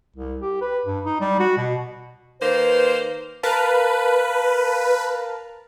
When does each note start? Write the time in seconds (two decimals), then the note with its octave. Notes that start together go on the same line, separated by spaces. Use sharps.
0.17 C2
0.41 G4
0.61 B4
0.85 G2
1.06 D#4
1.20 G3
1.39 F#4
1.57 B2
2.41 D#3 A#3 B4 C5
3.43 A#4 B4 F5 A5